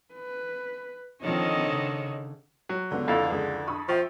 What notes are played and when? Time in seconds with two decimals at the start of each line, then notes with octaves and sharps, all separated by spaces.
0.13 B4
1.23 D3 D#3 F3 C4 C#5 D#5
1.68 C#3
2.69 F#3
2.91 C#2 D3 B3
3.08 F2 E4 A4 F5
3.32 C#2 G#4
3.67 D4 B5 C#6 D#6
3.89 F3 C5 E5 G5 C#6